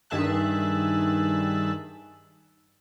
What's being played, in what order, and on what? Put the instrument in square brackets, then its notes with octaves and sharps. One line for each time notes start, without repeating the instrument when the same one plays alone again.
[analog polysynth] G2 D#3 G#4 E5 A5 F#6